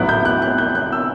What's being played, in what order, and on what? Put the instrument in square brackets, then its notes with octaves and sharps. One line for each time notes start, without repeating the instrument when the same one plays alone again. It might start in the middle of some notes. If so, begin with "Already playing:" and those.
Already playing: [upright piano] A1 A2 F#3 B3 E4 F#6
G6
F#6
F#6
G6
F#6
E6